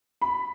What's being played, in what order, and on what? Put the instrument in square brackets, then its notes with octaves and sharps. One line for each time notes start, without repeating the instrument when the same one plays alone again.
[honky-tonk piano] B5